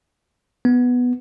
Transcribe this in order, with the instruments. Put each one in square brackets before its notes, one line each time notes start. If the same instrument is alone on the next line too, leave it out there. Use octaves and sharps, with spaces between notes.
[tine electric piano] B3